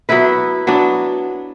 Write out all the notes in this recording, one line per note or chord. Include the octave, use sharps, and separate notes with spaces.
F#3 B3 E4 B4
F#3 B3 D4